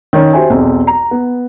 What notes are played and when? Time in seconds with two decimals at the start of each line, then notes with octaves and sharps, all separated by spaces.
0.13 D#3 C#4
0.33 F#4 G4 C5 E5 G#5
0.50 B1 E2 C4
0.87 A#5
1.11 B3